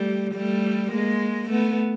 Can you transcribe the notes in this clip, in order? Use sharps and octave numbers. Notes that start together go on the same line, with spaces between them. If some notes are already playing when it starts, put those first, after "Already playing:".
Already playing: G3 A3
G3 A3
G#3 A#3
A3 B3